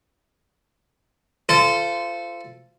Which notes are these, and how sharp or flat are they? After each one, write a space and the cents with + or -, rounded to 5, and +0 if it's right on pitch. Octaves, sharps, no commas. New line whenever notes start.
F4 -25 A4 +0 C5 -25